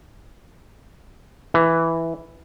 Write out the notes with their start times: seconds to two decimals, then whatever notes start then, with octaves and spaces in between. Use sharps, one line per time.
1.54 E3